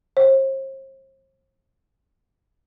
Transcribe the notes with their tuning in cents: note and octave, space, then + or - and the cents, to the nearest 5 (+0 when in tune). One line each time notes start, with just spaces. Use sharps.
C5 +40